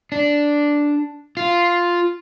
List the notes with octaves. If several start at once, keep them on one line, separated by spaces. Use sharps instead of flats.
D4
F4